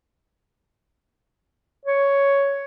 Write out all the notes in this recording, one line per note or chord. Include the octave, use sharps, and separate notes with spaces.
C#5